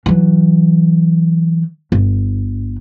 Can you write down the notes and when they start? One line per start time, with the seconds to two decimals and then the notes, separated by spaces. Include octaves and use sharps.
0.06 E3 F#3
1.92 G1